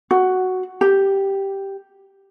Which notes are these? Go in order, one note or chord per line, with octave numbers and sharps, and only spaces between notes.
F#4
G4